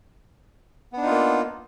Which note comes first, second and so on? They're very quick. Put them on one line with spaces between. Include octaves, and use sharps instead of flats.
B3 D4 D#4 F4 A#3